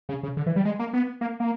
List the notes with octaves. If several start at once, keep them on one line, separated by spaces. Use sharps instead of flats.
C#3
C#3
D3
E3
G3
G#3
A#3
B3
A#3
A#3